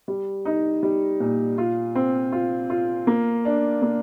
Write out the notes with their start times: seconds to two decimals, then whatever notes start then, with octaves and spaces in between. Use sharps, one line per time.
0.08 G3
0.45 D#4
0.83 G3
1.20 A#2
1.58 F4
1.95 C4
2.32 F4
2.70 F4
3.07 A#3
3.45 D4
3.82 A#3